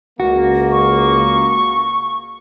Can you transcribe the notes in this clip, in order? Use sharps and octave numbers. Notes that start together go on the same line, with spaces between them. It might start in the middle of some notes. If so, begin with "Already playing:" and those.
C#2 A#3 F#4
C#6